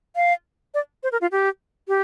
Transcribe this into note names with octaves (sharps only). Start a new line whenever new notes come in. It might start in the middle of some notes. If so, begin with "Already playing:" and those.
F5
D5
C5
A#4
F4
G4
G4